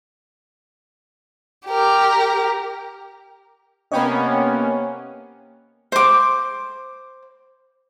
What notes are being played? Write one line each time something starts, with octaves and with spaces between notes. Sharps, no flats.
G4 A#4
C3 A#3 B3 C#4 D#5 G5 B5
C5 D6